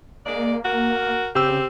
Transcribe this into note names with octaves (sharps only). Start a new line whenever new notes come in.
G#3 A#3 D5
F#4 A#4
C#3 C4 G4 E6